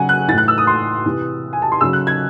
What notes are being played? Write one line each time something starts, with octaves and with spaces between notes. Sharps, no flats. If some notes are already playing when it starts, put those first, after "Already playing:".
Already playing: C#3 F#3 F#5 G#5
F#6
A2 E3 A6
F#6
E6
D#6
C6
C3 E3
G#5
A5
C6
C#3 F#3 E6
F#6
G#6